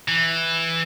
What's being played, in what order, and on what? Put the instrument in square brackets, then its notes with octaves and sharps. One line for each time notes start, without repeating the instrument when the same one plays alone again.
[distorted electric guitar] E3